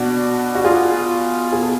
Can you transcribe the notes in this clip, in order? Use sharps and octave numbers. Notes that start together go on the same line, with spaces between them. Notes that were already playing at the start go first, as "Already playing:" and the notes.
Already playing: B2 D4 F#4
F#4
F4 G#4
B2 G#4
A4